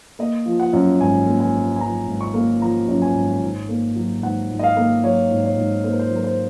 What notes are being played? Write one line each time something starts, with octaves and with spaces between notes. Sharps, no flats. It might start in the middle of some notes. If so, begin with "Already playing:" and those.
A#3 D#5
F3
F#5
F#2
G#1 G#5
A#3
G#5
F3
G#5
F#2 A#5
G#1
C#6
A#3
F3 A#5
F#2
G#5
G#1
G#2
A#3
F#3
G#2 F#5
G#2
D#5
F5
A#3
F#3 C#5
G#2
C#5
G#2
A#3 C5
A#4
C5
F#3
A#4
C5